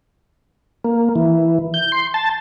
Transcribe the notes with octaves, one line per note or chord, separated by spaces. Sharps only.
A#3
E3
G6
C6
A5